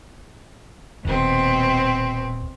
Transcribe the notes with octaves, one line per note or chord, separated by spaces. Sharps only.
D#1 B2 C4